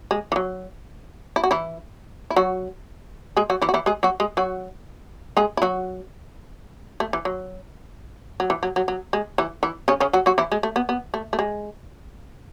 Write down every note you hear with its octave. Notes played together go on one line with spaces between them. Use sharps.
G#3
E3
F#3
E4
F#4
E3 E4
E4
F#3 F#4
G#3 G#4
F#3 F#4
E3 E4
F#4
E3 E4
G#3 G#4
F#3 F#4
G#3 G#4
F#3 F#4
G#3 G#4
E4
F#3 F#4
A3
E3
F#3
F#3
E3
F#3
F#3
F#3
G#3
E3 E4
E3 E4
C#3 C#4
C#3 C#4
F#3 F#4
F#3 F#4
E3 E4
G#3
A3
B3
B3
A3
A3
G#3